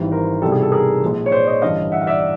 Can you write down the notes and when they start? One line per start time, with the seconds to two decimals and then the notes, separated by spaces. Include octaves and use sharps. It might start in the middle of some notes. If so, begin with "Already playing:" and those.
Already playing: G#1 G#2 E3 G3
0.11 A#4 C5
0.42 C2 B2 G3 A4
0.52 G#4
0.62 A4
0.72 G#4 A#4
1.02 A#1 A#2 F3 G#3
1.26 C#5
1.32 C5 D5
1.47 C#5 D#5
1.62 A1 G2 D3 D#5 F5
1.92 E5 F#5
2.02 F5
2.07 D5 E5